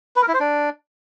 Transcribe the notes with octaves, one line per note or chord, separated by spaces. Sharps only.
B4
A#4
E4
C5
D4